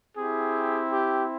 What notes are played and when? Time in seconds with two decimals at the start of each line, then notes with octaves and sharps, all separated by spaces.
0.17 C4 E4 G4 G#4
0.91 G4